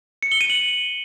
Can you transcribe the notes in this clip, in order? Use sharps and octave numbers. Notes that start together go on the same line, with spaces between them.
C#7
G7
D#7
F#7